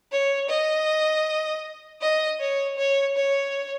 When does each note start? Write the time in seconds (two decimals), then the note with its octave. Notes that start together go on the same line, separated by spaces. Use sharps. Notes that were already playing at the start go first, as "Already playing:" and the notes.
0.12 C#5
0.49 D#5
2.01 D#5
2.40 C#5
2.77 C#5
3.16 C#5